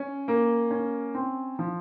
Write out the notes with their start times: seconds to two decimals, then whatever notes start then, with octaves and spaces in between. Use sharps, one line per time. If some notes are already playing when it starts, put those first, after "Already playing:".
Already playing: C#4
0.28 A#3
0.71 C#4
1.15 C4
1.59 F3